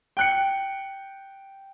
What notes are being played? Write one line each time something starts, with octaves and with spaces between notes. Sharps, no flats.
G5 F#6 C#7